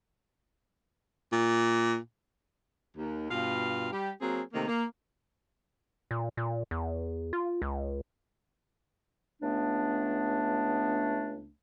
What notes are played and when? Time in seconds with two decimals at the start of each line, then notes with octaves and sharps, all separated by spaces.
1.33 A#2
2.96 D#2
3.30 G2 B2 F4 F5
3.92 G3 G4
4.20 F#3 A#3 C4 G#4
4.53 C3 D#3 A3 A#3
4.67 A#3
6.11 A#2
6.37 A#2
6.71 E2
7.33 F4
7.62 C#2
9.42 C#2 A3 B3 D4